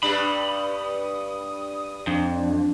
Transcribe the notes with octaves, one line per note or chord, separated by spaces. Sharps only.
G2 G3 D4 B5 D#6
F2 D4